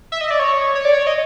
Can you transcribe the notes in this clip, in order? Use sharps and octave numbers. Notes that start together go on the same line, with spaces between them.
E5
D#5
D5
C#5
C#5
D5
C#5
D#5